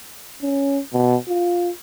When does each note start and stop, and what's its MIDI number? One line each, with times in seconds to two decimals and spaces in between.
0.42 0.80 61
0.93 1.16 47
1.28 1.70 65